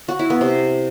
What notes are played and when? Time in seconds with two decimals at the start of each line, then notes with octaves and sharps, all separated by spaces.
0.08 F#4
0.19 E4
0.30 B3
0.41 C3